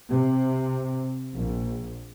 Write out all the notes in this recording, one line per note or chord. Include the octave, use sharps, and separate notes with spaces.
C3
A#1